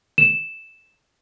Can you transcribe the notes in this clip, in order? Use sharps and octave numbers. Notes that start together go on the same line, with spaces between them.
E7